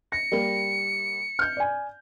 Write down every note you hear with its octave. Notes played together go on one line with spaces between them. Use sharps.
A#6 C#7
G3 A#3
F6 G6
D5 G#5